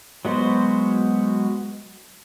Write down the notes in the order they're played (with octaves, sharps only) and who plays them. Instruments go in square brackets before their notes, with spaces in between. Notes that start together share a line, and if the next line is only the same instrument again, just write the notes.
[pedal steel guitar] F#3 G#3 B3 F#4 C5